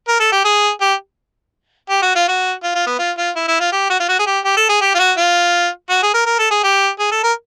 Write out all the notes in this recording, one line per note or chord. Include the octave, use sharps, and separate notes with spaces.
A#4
A4
G4
G#4
G4
G4
F#4
F4
F#4
F4
F4
B3
F4
F4
E4
E4
F4
G4
F#4
F4
F#4
G#4
G4
G4
A4
G#4
G4
F4
F#4
F4
F#4
G#4
A#4
A#4
A4
G#4
G4
G#4
A4
A#4